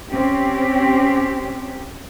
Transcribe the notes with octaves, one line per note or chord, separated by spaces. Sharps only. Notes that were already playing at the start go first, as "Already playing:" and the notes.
C4 C#4 G4